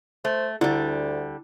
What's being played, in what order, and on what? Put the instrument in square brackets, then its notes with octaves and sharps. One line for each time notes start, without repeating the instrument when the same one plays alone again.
[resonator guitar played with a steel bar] A3 [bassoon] C5
[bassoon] D2 [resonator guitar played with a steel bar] D3 G3 [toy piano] E4